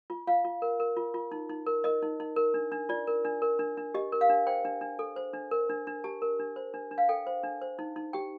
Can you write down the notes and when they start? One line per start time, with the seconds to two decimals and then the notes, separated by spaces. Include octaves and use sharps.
0.10 F4
0.27 F4 F5
0.45 F4
0.62 A#4
0.80 A#4
0.97 F4
1.14 F4
1.31 D#4
1.49 D#4
1.66 A#4
1.84 A#4 D#5
2.02 D#4
2.20 D#4
2.36 A#4
2.54 D4
2.72 D4
2.89 F4 D5
3.07 A#4
3.25 D4
3.42 A#4
3.59 D4
3.77 D4
3.94 G4 D#5
4.12 A#4
4.21 F5
4.29 D4
4.47 C5 G5
4.65 D4
4.81 D4
4.99 A4
5.16 C5
5.33 D4
5.51 A#4
5.69 D4
5.87 D4
6.04 G4 A5
6.22 A#4
6.40 D4
6.56 C5
6.74 D4
6.91 D4
6.98 F5
7.09 A4 G5
7.27 C5
7.43 D4
7.62 C5
7.79 D#4
7.96 D#4
8.13 G4 G5